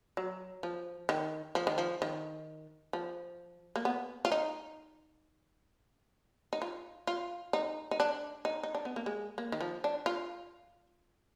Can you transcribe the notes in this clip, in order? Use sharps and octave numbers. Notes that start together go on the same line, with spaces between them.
F#3
F3
D#3
F3
D#3
F3
D#3
F3
A#3
B3
F4
D#4
D#4
F4
F4
D#4
D#4
D4
D#4
D#4
D4
B3
A#3
G#3
A#3
D#3
F3
D4
F4